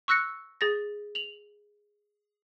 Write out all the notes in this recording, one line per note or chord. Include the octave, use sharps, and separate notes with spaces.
C#6 E6 F#6 A#6 C#7
G#4 A6 A#6
F7 F#7